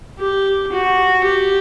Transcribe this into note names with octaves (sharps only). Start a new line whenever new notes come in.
G4
F#4
G4